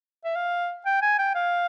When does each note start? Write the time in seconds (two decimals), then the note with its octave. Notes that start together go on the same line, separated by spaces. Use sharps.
0.25 E5
0.36 F5
0.86 G5
1.02 G#5
1.18 G5
1.35 F5